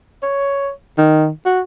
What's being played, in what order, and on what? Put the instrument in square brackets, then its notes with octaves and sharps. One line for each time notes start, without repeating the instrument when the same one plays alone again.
[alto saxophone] C#5
D#3
F#4